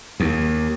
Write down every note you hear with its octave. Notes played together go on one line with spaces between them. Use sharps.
D#2